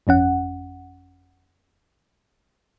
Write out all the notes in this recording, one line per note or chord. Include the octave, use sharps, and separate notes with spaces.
G1 F2 C#4 F#5